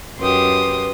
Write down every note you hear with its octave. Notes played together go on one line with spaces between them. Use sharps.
F#2 G4 B4 C6 D#6